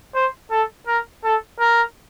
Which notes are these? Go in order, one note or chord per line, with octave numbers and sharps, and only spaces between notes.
C5
A4
A#4
A4
A#4